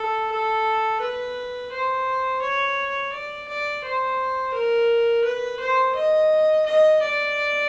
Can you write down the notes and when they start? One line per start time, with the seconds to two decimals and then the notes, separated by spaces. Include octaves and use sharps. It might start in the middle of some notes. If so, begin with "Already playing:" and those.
Already playing: A4
0.31 A4
1.01 B4
1.72 C5
2.42 C#5
3.13 D5
3.48 D5
3.84 C5
4.54 A#4
5.24 B4
5.60 C5
5.95 D#5
6.66 D#5
7.02 D5